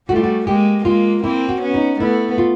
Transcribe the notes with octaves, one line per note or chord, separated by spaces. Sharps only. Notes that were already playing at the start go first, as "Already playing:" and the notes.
G3 A3 F#4
F4
F#4
G#3 A#3 G4
G#3 A#3 F4
A#3 C4 E4
F#4
B3 C#4
D#4
A3 B3 E4
F4